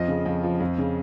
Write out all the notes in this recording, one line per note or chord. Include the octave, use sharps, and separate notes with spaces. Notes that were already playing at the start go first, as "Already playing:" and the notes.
Already playing: F2 F3 D#5
C#3
F2
F3
F2
C#3